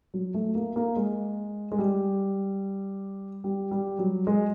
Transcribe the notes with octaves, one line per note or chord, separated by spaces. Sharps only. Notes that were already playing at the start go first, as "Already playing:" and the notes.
F#3
A3
A#3
A#3
G#3
G#3
G3
G3
G3
F#3
G#3